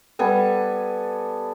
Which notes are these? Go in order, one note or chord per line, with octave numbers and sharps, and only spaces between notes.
G3 B3 A4 G#5